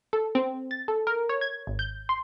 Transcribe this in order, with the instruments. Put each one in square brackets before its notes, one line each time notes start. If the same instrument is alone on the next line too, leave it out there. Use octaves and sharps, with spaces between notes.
[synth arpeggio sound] A4
C4
A6
A4
A#4
C#5
G#6
G#1
G6
C6